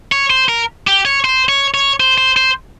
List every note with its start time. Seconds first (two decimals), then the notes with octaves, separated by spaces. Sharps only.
0.12 C#5
0.30 C5
0.49 A#4
0.87 G4
1.05 C#5
1.25 C5
1.49 C#5
1.74 C#5
2.00 C5
2.18 C5
2.37 C5